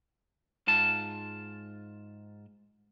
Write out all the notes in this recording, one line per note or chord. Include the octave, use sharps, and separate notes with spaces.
G#2 F4 A5